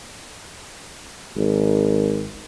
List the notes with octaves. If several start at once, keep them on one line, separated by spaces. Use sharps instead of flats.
G#1